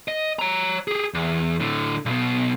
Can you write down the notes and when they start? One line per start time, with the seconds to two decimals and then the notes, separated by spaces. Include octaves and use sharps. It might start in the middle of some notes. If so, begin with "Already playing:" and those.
0.08 D#5
0.39 C#5 A#5
0.88 G4 G#4
1.14 E2
1.60 A2 D3
2.06 B1 B2